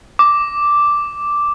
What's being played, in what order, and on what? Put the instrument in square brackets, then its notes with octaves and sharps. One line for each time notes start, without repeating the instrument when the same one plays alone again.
[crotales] D6